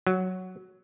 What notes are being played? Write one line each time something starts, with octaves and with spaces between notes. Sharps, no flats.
F#3